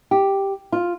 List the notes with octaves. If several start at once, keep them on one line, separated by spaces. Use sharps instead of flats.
G4
F4